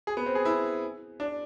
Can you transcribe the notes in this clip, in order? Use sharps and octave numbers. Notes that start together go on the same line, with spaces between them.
G#4
B3
C4
G#4
E4
D4